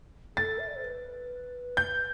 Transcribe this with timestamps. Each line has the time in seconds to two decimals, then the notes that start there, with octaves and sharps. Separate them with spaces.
0.36 A4 A6
0.59 E5
0.68 D5
0.76 C5
0.84 B4
1.77 G6